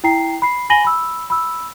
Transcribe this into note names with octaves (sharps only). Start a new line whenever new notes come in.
E4 G5 A#5 C7
B5 C7
G#5 B5 A#6 D#7 F#7 G7
B5 E6
B5 E6